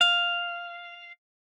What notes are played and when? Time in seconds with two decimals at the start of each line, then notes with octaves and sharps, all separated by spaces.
0.01 F5